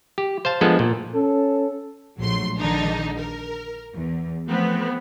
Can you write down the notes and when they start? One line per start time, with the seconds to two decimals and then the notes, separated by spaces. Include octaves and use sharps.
0.18 G4
0.45 C5 F5 A5
0.61 F3 G#3 B3 D4 A4
0.79 A#2
1.15 C#4 A4
2.20 A#1 F#3 A3 C6
2.59 A#1 D3 D#3 G#3 D4 D#4
3.18 A#4
3.95 E2
4.47 F3 A3 B3 C4